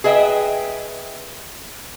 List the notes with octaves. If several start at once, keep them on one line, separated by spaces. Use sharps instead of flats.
G#4 B4 D#5 E5 G5